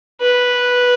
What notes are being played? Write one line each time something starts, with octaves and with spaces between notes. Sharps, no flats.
B4